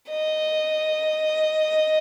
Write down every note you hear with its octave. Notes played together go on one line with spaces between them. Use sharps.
D#5